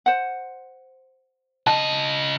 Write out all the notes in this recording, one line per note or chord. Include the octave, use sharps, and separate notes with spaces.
C5 F#5
C#3 D#5 A5